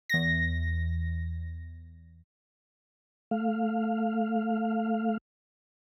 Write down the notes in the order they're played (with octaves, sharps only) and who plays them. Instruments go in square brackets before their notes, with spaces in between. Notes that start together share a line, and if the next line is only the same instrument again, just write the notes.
[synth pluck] E2 A#6
[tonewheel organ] A3 F5